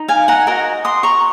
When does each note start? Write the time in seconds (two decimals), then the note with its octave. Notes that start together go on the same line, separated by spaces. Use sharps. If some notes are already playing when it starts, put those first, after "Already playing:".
Already playing: D#4
0.08 F5 G#5
0.28 F#5 A#5
0.47 F#4 A#4 D#5
0.85 C6 D#6
1.03 A#5 C#6